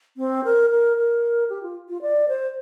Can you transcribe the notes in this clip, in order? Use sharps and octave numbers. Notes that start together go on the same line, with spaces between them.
C4
A#4
A#4
A#4
G4
F4
F4
D5
C5